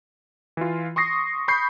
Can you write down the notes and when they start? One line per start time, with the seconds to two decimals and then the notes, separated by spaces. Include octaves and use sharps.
0.57 E3 F4
0.96 C6 C#6 D#6 A#6 C7
1.48 B5 C#6 G6 C7